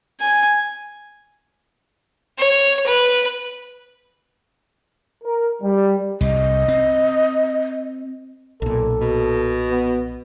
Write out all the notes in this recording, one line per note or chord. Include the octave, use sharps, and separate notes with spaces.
G#5
C#5
B4
A#4
G3
C2 D#5
C4
B1 A#2 A4
B2
B3